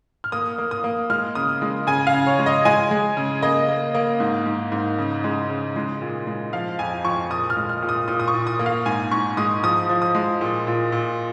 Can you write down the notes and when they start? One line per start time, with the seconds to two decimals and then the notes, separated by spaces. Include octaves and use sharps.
0.24 F6
0.32 A#3 D#6
0.58 A#3
0.71 D#6
0.84 A#3
1.10 G#3 F6
1.35 C#3 D#6
1.62 G#3
1.87 C#3 G#5
2.07 F5
2.14 C#3
2.27 C#5
2.39 G#3
2.46 D#5
2.65 G#3 G#5
2.91 G#3
3.17 C#3
3.42 A#3 D#5
3.68 A#3
3.95 A#3
4.20 G#2
4.46 G#2
4.72 G#2
4.98 C#3
5.24 G#3
5.50 C#3
5.76 G#3
6.01 A#2
6.27 G#3
6.53 F3 F5
6.79 F2 G#5
7.05 F2 C#6
7.30 A#2 D#6
7.50 F6
7.57 G#3
7.69 F6
7.82 A#2
7.89 D#6
8.08 A#2 D#6
8.20 D#6
8.28 C#6
8.34 A#2
8.47 D#6
8.59 A#3
8.66 F5
8.86 G#2 G#5
9.11 G#2 C#6
9.37 G#3 D#6
9.63 F3 D#6
9.89 F3
10.02 D#6
10.15 G#3
10.41 A#2
10.67 A#2
10.92 A#2